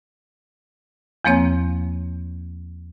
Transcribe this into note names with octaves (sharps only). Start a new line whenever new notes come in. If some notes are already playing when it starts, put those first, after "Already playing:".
E2 F3 A#3 C4 C#5